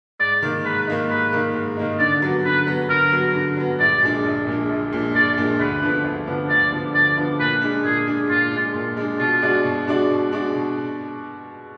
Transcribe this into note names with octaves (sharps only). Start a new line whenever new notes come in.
G#2 D5
D#3 A#3 D#4
G#2 B4
D#3 A#3 D#4
G#2 B4
D#3 A#3 D#4
G#2
D#3 A#3 D#4
D3 D5
F#3 B3
D3 B4
F#3 B3
D3 A#4
F#3 B3
D3
F#3 B3
A#1 D5
A#2 G#3 D4
A#1
A#2 G#3 D4
A#1
A#2 G#3 D4
A#1 D5
A#2 G#3 D4
D2 B4
D3 F3 B3 D4
D2
D3 F3 B3 D4
D2 D5
D3 F3 B3 D4
D2 D5
D3 F3 B3 D4
A#2 B4
G#3 D4
A#2 G#4
G#3 D4
A#2 F4
G#3 D4
A#2
G#3 D4
B2 F4
G#3 D4 F#4 D5
B2
G#3 D4 F#4 D5
B2
G#3 D4 F#4 D5
B2